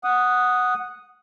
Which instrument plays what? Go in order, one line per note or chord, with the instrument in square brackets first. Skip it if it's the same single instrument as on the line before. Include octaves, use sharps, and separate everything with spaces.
[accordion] F#5 D#6